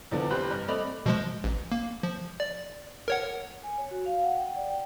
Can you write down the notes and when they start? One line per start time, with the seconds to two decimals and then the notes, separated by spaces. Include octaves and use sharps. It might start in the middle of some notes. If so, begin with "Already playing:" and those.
0.11 E2 D3 F3 B3 D4
0.30 F1 E3 G4 C5 B5 F#6
0.50 G2
0.68 A3 C4 D5 D#5 B5 F7
1.06 B2 F3 G#3
1.44 A1
1.72 A#3
2.03 F3
2.40 D5
3.08 A#4 C#5 F#5
3.63 G#5
3.78 C#5
3.91 F#4
4.06 F5
4.23 F#5
4.36 G5
4.56 D5
4.70 G5